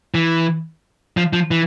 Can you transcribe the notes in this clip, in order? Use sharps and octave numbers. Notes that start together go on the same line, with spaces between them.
E3
F3
F3
E3